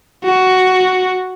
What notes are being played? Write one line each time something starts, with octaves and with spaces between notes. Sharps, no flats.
F#4